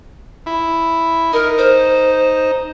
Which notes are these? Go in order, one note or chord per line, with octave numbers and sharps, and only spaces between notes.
E4
D#4 A#4
C5